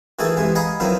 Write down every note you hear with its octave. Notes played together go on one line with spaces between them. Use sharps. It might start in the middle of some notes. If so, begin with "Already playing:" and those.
D#3 E3 A3 F#4 G#4 A4
C3 E3 G#3 B3
D#5 F5 F#5 G#5 A#5 B5
D#3 F3 F#3 B3 C4 E4